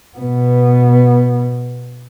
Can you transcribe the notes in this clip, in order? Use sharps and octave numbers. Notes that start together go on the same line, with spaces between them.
B2 B3